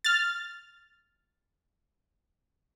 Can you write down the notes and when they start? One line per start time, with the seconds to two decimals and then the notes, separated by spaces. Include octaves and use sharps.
0.04 F6 A6